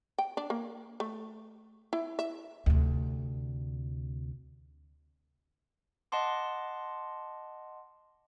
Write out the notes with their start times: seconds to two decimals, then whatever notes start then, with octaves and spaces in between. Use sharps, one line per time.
0.18 G5
0.37 D4
0.50 A#3
1.00 A3
1.93 E4
2.19 E5
2.66 D2 C3
6.12 D#5 F#5 A5 C6 D6